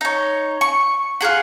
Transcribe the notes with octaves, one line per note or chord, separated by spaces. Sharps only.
D#4 C#5
C#6
F4 G4 G#4 F#5